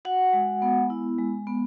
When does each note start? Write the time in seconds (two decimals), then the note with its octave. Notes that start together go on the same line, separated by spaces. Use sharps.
0.05 F#4 F#5
0.33 G#3
0.62 B3
0.90 E4
1.19 G#3
1.47 B3